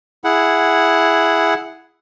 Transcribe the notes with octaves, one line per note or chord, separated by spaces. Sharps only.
E4 G#4 F#5